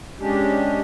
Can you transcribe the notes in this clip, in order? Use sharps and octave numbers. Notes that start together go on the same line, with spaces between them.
G#3 C#4 D4 G4